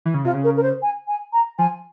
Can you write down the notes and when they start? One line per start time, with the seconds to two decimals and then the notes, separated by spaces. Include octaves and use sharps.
0.05 E3
0.14 C#3
0.24 C3 F4
0.34 C#3
0.44 A#4
0.56 A#4
0.63 C5
0.82 G#5
1.08 G#5
1.33 A#5
1.59 F3 G#5